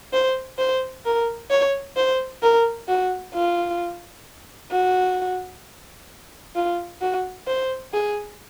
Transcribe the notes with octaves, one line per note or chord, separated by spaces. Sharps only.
C5
C5
A#4
C#5
C5
A#4
F#4
F4
F#4
F4
F#4
C5
G#4